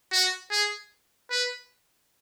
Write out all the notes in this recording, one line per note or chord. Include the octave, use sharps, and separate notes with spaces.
F#4
G#4
B4